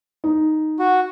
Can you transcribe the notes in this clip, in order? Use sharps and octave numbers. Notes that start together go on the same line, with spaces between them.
D#4
F#4